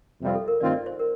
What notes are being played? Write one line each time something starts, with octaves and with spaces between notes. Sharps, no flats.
F2 C3 G3 C4 F4
A4
A#4
G2 D#3 A3 C4 F4 D5
D5
C5
A#4